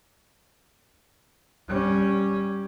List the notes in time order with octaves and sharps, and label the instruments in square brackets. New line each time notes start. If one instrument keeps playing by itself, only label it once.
[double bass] G3 C#4